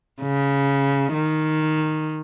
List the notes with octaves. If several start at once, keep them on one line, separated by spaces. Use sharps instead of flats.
C#3
D#3